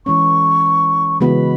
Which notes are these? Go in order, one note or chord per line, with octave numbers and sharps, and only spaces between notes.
E3 G#3 C#4 C#6
C#3 E3 G#3 B3 F#4 B5